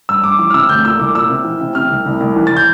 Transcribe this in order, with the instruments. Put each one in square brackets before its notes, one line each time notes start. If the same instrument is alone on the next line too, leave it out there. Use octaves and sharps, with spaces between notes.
[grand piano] G2 E6
G2 D6
E3 D6
F6
C3 E6
D2 G6
A#2 E6
C2 D6
A#2 E6
C3
E3
C3
C3 F6
C2
C2
C2
E3
A6
G6